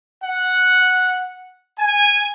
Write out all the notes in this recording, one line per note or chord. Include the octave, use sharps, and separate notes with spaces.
F#5
G#5